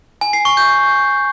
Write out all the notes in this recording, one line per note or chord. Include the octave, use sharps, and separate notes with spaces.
G#5
C7
C#6
G6